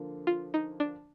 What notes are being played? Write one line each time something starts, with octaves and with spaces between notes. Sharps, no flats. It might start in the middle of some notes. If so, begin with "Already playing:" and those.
Already playing: D3 F3 A#3
F4
D#4
D4